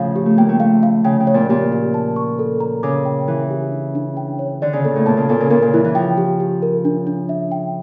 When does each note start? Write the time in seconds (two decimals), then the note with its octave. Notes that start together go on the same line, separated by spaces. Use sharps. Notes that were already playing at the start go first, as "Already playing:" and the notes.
Already playing: A2 C#3 F3 F5
0.16 G4
0.26 A3
0.38 A#3 G5
0.49 A3
0.60 A3 F5
0.83 F5
1.04 C#3 G5
1.20 C#3
1.27 C#5
1.34 A#2
1.49 A#2 G4
1.72 G4
1.94 A5
2.16 C#6
2.39 A4
2.60 A#5
2.83 C#3 D6
3.05 G5
3.28 E3 A#4
3.50 G4
3.72 D4
3.95 D4
4.17 G5
4.39 C#5
4.62 D3 D5
4.73 C#3
4.84 A#2 A4
4.96 A2
5.06 A#2 A5
5.17 C#3
5.29 A#2 A4
5.40 C#3
5.50 A#2 A#4
5.62 C#3
5.74 E3 E4
5.84 E3
5.95 F3 G5
6.18 G4
6.40 G4
6.62 A#4
6.85 D4
7.07 D4
7.29 E5
7.52 G5